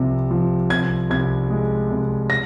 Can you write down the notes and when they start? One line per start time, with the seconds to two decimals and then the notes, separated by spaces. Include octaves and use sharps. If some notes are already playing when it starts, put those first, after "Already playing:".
Already playing: C2 C3 F3
0.31 F3
0.70 C2 G#6
1.10 C2 G#6
1.50 G#3
1.90 C2
2.30 A#6